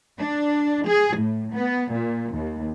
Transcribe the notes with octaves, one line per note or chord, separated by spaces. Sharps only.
D4
G#4
A2
B3
A#2
D#2